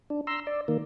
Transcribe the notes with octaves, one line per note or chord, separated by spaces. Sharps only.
D4
A#5 C6 E6
D5
D#3 A#3